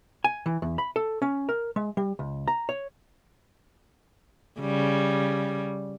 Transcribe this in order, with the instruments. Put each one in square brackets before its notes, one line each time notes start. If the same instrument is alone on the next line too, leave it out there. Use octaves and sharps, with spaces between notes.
[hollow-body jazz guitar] G#5
E3
E2
B5
A4
C#4
A#4
G#3
G3
C#2
A#5
C#5
[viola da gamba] C#3 G3